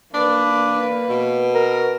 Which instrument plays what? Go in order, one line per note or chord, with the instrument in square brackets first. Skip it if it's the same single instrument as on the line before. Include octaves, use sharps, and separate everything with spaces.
[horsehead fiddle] A#3 B4 [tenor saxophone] D4
[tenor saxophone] B2
[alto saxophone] A#4